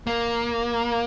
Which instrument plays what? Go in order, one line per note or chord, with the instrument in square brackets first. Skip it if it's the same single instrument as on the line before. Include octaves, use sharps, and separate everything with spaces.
[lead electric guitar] A#3